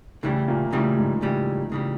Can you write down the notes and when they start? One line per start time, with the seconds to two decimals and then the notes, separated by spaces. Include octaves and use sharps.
0.23 A2 C#3 E3 G3 A3
0.48 A#2 A#3
0.72 A2 C#3 E3 G3 A3
0.97 G#2 G#3
1.22 C#3 E3 G3
1.72 C#3 E3 G3